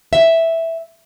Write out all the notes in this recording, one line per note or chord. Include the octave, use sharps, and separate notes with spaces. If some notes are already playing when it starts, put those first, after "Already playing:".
E5